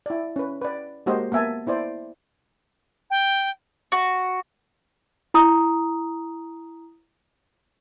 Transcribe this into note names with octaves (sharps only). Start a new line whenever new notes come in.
E4 D5
C#4 B4
B4 D5
G#3 A#3 F#4 G4 C5 D#5
A#3 B3 E5 G#5 A5
B3 E4 C5 D5
G5
F#4
E4 A#5 D#6